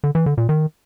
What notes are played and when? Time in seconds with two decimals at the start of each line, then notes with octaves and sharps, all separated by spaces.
0.04 D3
0.15 E3
0.26 D3
0.38 A#2
0.49 D#3